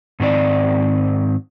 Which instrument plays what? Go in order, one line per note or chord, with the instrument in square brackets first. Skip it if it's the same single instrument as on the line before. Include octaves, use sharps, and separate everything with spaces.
[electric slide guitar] G#2 D#3 C4 D5